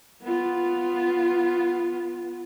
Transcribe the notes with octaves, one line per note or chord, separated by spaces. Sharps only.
B3 F4